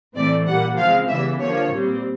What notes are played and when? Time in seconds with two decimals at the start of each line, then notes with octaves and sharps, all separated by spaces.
0.15 A2 E3 A3 C4 D5
0.47 A#2 G3 A#3 F#5
0.78 C#3 F3 G#3 C4 F5
1.09 C#3 E3 G3 B3 E5
1.40 D3 F3 A#3 C#5
1.72 A#2 G3 C4